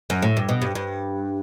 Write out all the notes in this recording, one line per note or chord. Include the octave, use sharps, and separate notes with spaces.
F#2
A2
G2
B2
G2
G2